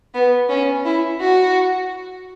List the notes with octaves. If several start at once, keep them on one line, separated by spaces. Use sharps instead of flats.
B3
C#4
E4
F#4